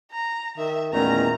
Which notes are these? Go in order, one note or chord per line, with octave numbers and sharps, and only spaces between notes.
A#5
D#3 E5
E2 A#2 D#3 A3 C#4 A#5